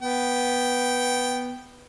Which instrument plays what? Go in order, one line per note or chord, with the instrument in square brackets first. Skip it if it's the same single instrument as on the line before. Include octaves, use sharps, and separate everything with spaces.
[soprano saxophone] B3 [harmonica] G5